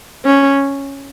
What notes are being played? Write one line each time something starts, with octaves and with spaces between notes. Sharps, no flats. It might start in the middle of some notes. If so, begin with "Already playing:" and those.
C#4